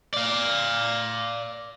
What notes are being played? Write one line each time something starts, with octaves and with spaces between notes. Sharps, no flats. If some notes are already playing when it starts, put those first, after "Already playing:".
D5 F5